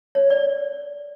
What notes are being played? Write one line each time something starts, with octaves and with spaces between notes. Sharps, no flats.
C#5
D5